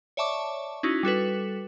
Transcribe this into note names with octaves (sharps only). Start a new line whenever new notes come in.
C#5 D5 E5 A5 C#6 D6
C#4 D#4 E4 F#4
G3 F#4 A4 B4